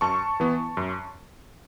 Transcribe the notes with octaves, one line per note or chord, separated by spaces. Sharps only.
F#2 A5 C#6
E3 B3
F#2